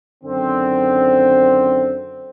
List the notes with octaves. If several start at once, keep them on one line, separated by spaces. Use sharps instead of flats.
F#2 D3 D#3 C4